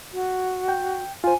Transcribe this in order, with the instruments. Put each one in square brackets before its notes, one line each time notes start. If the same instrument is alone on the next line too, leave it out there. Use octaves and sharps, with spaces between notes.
[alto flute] F#4
[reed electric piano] G5
[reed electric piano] F4 C5 [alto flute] G#5